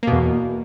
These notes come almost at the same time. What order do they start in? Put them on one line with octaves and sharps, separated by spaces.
A#3 B2 E2